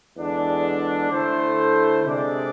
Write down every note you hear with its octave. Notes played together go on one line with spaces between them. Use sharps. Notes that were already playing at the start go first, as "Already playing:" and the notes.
E2 D3 G#3 D4
D3 A3 E4 A4 C5
C3 G#3 D4 A4 D5